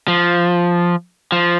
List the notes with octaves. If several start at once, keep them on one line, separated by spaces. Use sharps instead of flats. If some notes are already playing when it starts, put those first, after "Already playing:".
F3
F3